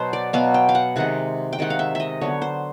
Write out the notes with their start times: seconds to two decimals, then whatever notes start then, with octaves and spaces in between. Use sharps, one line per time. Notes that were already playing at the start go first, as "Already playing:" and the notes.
Already playing: B2 F#3 B3 C5
0.13 D5
0.33 B2 F#3 B3 F5
0.54 G5
0.69 F5
0.75 F#5
0.96 C3 D#3 G#3 F#5
1.53 G5
1.59 C3 D#3 G#3 F#5
1.70 F5
1.79 E5
1.95 D#5 E5
2.21 D3 F#3 B3 C#5
2.42 C5